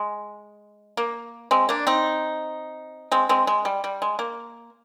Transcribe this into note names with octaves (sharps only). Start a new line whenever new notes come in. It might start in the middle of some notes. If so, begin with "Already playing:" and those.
Already playing: G#3
A#3
G#3 C4
A#3 D4
C4 D#4
G#3 C4
G#3 C4
G#3
G3
G3
G#3
A#3